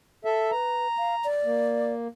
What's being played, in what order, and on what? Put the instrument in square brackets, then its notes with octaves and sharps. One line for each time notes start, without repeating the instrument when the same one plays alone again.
[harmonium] A4 E5
[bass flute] B4 [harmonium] A#5
[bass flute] F5
D5
[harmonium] A#3